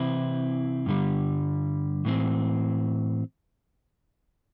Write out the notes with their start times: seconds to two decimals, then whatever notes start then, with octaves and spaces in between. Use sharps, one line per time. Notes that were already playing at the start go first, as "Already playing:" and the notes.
Already playing: C3 E3 C4 E4
0.86 G2 D3 G3
2.05 A2 E3 C4